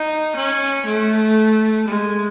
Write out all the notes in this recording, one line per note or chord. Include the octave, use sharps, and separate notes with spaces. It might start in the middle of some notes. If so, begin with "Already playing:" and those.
Already playing: D#4
C#4
A3
G#3